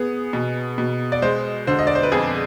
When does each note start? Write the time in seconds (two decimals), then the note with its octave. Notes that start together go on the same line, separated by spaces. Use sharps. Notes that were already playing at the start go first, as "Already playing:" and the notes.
Already playing: B3 G#4
0.33 B2
0.78 B2
1.12 D5
1.22 G#3 C5
1.67 D3 C5
1.79 D#5
1.87 D5
1.95 C5
2.03 B4
2.12 F2 G#4